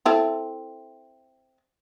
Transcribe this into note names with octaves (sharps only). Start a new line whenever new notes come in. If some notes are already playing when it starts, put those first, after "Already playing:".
C4 E4 A4